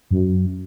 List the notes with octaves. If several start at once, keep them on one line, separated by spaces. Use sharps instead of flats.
F#2